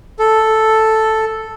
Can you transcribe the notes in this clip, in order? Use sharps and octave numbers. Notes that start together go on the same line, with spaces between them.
A4